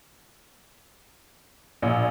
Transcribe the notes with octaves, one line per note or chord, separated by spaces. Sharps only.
A#1